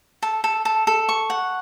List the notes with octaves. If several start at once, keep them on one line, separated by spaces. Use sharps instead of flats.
A4
A4
A4
A4
C#6
F#5